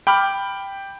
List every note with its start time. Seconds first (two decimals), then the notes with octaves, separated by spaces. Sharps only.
0.07 G5 B5 D6 F6